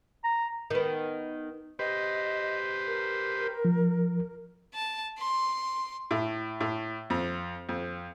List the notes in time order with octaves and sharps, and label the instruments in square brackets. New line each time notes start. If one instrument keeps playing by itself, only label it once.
[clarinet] A#5
[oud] D#3 B3
[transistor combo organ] G4 B4 C5 [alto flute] D#5
[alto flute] A#4
[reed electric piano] F3
[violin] A5
C6
[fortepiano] A2
A2
F2
F2